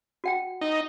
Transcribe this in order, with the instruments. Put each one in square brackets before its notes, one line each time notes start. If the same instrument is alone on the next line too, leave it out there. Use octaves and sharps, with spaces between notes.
[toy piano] F#4 F#5 G5
[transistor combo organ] D#4